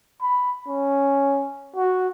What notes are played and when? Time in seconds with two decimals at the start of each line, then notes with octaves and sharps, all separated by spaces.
0.22 B5
0.67 C#4
1.75 F#4